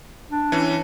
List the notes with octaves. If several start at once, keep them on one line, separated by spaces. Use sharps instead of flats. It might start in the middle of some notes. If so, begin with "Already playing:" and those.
D4
E3 C#4